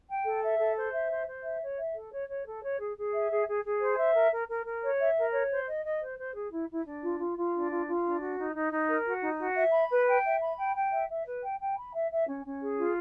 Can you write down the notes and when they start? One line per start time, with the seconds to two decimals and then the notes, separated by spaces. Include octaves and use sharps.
0.08 G5
0.25 A4
0.42 E5
0.59 A4
0.76 C5
0.92 E5
1.10 C5
1.26 C5
1.43 E5
1.61 C#5
1.77 E5
1.94 A4
2.11 C#5
2.28 C#5
2.45 A4
2.62 C#5
2.78 G#4
2.96 G#4
3.12 E5
3.30 G#4
3.47 G#4
3.64 G#4
3.81 C5
3.97 E5
4.14 A#4
4.32 A#4
4.48 A#4
4.65 A#4
4.82 C#5
4.99 E5
5.17 A#4
5.32 C#5
5.50 C5
5.67 D#5
5.83 D#5
6.00 C5
6.18 C5
6.34 G#4
6.51 E4
6.68 E4
6.86 D4
7.02 F4
7.19 F4
7.37 F4
7.54 D4
7.70 F4
7.86 F4
8.04 D4
8.20 F#4
8.37 D#4
8.54 D#4
8.71 D#4
8.88 A#4
9.06 F#4
9.22 D#4
9.40 F#4
9.56 E5
9.73 B5
9.90 B4
10.06 G5
10.24 E5
10.41 B5
10.58 G5
10.75 G5
10.92 E5
11.09 E5
11.25 B4
11.43 G5
11.59 G5
11.76 B5
11.93 E5
12.10 E5
12.27 C#4
12.45 C#4
12.61 G#4
12.78 F4